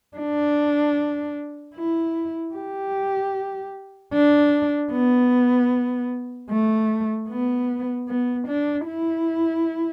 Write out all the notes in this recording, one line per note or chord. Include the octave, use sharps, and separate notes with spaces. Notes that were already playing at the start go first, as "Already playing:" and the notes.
D4
E4
G4
D4
B3
A3
B3
B3
D4
E4